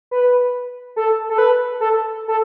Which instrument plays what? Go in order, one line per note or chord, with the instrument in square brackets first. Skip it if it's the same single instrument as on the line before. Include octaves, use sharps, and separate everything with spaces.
[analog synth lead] B4
A4
A4
B4
A4
A4